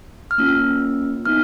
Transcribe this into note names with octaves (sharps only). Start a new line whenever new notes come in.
F6
A#3 C#4 F4 E6
B3 D#4 F6